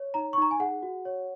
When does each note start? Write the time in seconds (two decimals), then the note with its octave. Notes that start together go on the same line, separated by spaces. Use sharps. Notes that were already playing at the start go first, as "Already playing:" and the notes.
Already playing: C#5
0.14 D#4 A#5
0.33 C#6
0.38 D#4 A#5
0.51 G#5
0.60 G#4 F#5
0.83 F#4
1.05 C#5